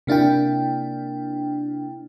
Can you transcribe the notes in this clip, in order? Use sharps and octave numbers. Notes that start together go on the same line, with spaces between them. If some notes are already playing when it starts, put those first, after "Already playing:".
C3 A#3 D4 E4 G5